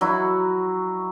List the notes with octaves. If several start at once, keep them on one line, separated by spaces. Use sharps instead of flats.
F#3 E4 F#4